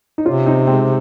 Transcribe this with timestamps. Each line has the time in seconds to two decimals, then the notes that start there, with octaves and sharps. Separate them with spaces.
0.18 D#4
0.25 C3 C#4 F4
0.46 C4 D#4
0.67 G#3 C4